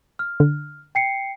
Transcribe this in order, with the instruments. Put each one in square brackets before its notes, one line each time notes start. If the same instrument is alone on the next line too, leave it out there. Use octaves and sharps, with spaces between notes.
[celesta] F6
[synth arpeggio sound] D3
[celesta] G5 C7 C#7